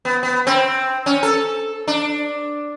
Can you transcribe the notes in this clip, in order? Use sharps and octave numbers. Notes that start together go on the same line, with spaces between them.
B3
B3
C4
C#4
A4
D4